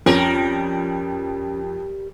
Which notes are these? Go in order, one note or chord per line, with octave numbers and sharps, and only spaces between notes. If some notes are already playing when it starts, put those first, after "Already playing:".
F2 G3 C#4 A#4